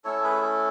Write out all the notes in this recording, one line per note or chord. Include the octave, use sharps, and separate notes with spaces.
A3 C#4 E4 A4 C#5
G#4 B4